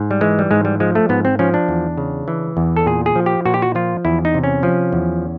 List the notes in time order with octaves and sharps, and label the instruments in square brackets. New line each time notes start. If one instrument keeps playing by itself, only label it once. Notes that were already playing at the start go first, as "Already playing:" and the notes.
Already playing: [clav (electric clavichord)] G#2
G3
E3 G#3
G3
G#2 G#3
G3
F3 G#3
A3
G#2 B3
C4
F3 C#4
D4
E2
C#3
E3
E2
A4
A#2 G#4
G#4
F3
G4
A#2 F#4
G4
F#4
F3 F4
E2 E4
D#4
C3
C#4
F3
E2